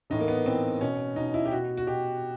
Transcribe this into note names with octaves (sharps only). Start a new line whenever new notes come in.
A2 E3 D#4
A#3
B3
A2 E3 C4
B2 C#4
B2 D#4
E4
G4
B2 F#4
F#4
B2 G4